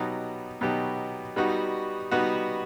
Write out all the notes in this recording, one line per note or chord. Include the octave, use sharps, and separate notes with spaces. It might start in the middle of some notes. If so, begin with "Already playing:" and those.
Already playing: B2 F#3 B3 D#4 G4
B2 F#3 B3 D#4 G4
G3 B3 D#4 F#4
G3 B3 D#4 F#4